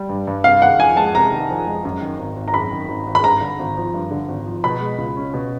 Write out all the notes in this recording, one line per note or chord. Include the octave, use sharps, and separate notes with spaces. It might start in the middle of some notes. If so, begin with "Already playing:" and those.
Already playing: G3
G2
G2
C3 F5
D#3 F#5
F2 G#5
G#3 A5
C3 A#5
D#3
F2
G#3
F#2
D#3
G#1
G#1
A#5
F#2 B5
D#3
G#1
G#1
B5
G2 A#5
D3
G#1
F3
G2
D3
G#1
F3
B2 B5
G#3
C#2
C#4
B2